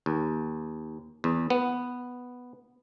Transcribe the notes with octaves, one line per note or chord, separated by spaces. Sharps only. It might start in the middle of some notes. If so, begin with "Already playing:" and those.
D#2
E2
B3